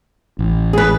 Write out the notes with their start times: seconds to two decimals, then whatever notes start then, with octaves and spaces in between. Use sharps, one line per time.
0.39 A1
0.73 G#4 B4